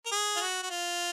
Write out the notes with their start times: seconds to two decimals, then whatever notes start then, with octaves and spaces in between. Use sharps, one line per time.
0.06 A#4
0.11 G#4
0.36 F4
0.41 F#4
0.62 F#4
0.70 F4